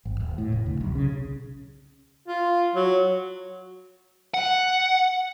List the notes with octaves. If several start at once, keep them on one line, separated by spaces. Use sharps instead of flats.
G#1
D#1
A2
F1
D2
B1
C#3
F4
F#3
F#5